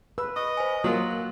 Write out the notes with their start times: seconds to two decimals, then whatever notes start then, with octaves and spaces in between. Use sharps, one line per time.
0.18 B4 E6
0.36 D#5 C#6
0.57 C5 G#5
0.84 F#3 A#3 F4 A#4 F#6 F#7